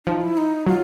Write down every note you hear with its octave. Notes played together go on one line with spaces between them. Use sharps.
F3 D#4
E4
D#4
F#3 F4